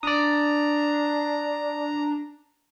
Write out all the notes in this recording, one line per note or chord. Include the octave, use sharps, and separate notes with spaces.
D4 D5 A#5 D#6